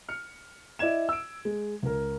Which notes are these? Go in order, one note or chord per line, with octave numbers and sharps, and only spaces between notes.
F6 C#7
E4 D5 D#5 G#6 E7
E6 D7
G#3
C#2 A#4